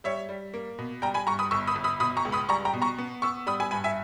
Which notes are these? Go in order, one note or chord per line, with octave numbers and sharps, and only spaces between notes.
G3 C#5 E5
G3
A#3
B2
G3 G5 A#5
G#5 B5
G2 A#5 C#6
B5 D#6
G1 C#6 E6
B5 D#6
G1
B5 D#6
B2 B5 D#6
A#5 C#6
C#2
B5 D#6
G3 A#5 C#6
G5 A#5
B2
A#5 C#6
B3
B3 C#6 E6
G3 B5 D#6
G#5 B5
G2 G#5 B5
E5 G#5